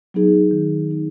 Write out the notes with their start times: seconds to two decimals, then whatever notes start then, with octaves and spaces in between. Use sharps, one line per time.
0.14 F#3 B3 D#4 G#4
0.51 D#3
0.89 F#3 B3 D#4 G#4